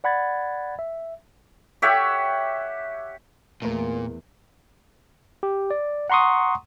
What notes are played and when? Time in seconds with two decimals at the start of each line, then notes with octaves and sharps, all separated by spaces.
0.04 D5 F#5 B5 G#6 A6
0.79 E5
1.82 G4 C#5 E5 F#5
3.62 E2 A#2 A3 A#4
5.43 G4
5.71 D5
6.10 F#5 A#5 C6 C#6 D#6